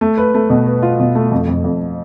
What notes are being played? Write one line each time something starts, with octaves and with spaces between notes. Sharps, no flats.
A3
B4
A3
B2
B4
F4
B2
A3
F2
F2
F2